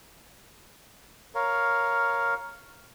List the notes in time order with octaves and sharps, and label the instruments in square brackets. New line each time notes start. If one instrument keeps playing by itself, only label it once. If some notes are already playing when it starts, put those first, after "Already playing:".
[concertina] A#4 C#5 F5